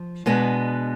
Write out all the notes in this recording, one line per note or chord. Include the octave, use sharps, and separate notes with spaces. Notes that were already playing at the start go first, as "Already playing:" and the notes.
Already playing: F3
B2 G#3 B3 D4